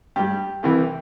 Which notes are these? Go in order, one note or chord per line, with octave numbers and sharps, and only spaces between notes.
G2 G3 G4
C2 C3 E3 G4